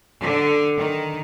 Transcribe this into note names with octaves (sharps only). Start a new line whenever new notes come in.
D3
D#3